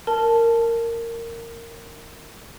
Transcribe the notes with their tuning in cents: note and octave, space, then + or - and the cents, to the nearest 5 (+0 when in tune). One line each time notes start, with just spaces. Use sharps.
A#4 -15 A5 -5